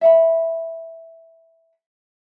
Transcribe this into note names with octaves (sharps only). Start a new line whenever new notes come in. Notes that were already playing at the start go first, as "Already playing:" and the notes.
E5 F#5 B5